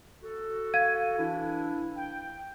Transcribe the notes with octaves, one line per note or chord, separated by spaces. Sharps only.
F#4 A4
F5 G#6 D#7
E3 D4 E4
G5